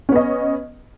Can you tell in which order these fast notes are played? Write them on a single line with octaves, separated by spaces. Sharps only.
C#4 B3 D#5